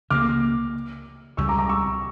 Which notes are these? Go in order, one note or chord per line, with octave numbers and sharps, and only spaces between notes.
C#2 C#3 F3 A#3 D6 F6
C#2 C#3 G3 C#6 E6
A#5 D6
A#5 D6
C#6 E6